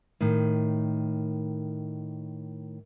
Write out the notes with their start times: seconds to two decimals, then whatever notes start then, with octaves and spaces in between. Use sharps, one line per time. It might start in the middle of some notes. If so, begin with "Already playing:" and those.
0.21 A2 D#3